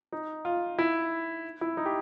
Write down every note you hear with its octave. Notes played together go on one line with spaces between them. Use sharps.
D#4
F4
E4
E4
D#4
G4